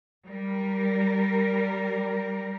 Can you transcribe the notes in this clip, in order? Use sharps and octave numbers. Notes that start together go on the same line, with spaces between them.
G3 A#4